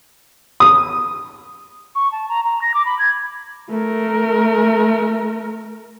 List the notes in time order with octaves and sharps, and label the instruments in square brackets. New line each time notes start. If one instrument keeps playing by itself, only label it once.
[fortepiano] D#6
[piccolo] C#6
A5
A#5
A#5
A#6
D6
B5
G#6
[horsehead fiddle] A3 A#4